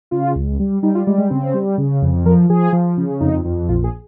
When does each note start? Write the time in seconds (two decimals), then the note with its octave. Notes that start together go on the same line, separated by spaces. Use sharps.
0.11 C#3 F4
0.35 C#2
0.59 G3
0.83 G3 D#4
0.95 F4
1.07 G3 G#3
1.18 G#3
1.30 C#3 C4
1.54 G3
1.78 C#3
2.02 F2
2.25 F3 A#4
2.50 F3 G#4
2.73 F3
2.97 C#3
3.21 F2 D#4
3.45 F2
3.69 A#1 F4
3.84 G#4